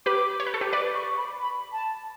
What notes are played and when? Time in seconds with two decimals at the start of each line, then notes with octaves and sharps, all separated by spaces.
0.06 G4 B4 D6
0.40 C#5
0.47 B4
0.54 A4
0.61 G4 B4
0.73 B4 D5 D6
0.94 C#6
1.17 B5
1.39 B5
1.72 A5